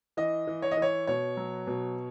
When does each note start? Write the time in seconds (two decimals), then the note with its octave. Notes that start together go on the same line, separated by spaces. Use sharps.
0.17 E3 D#5
0.47 E3
0.62 C#5
0.71 D#5
0.77 E3 C#5
1.07 B2 C#5
1.37 F#3
1.67 B2